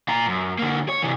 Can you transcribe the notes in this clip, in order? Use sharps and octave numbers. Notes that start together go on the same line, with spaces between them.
A#2 A#5
F#2
D3 A#3
C#5
C3 E3